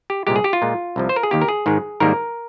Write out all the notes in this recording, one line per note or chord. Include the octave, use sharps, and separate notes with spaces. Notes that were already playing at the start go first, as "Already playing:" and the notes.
G4
C2 A#2 G#3 G4
G#4
G4
F4
A#2 G#3
C2 C3 F3
C5
A#4
G#4
D#2 D#3 A#3 G4
A#4
G#4
G#2 D#3 G#3
G#2 D#3 G3 A#3 A#4